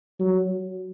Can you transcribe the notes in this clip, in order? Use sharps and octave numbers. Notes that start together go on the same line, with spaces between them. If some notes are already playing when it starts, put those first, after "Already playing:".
F#3